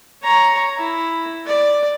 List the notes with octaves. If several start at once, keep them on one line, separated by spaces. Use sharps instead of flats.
C#5 A#5
E4
D5